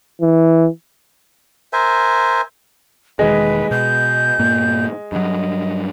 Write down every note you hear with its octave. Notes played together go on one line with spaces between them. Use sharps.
E3
A#4 C5 E5 G#5
E1 D#3 G#3 B4
B2 G6
G2 A#2 A#3
G2 F#3 D#5